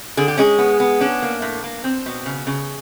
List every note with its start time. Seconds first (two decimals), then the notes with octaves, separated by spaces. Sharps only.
0.17 D3 G#4
0.28 G4
0.37 G#3 C#4 G#4
0.59 B3
0.80 B3
1.01 C#4 D4
1.22 A#3
1.42 A2
1.64 A#3
1.84 C4
2.06 B2
2.26 C#3
2.47 C#3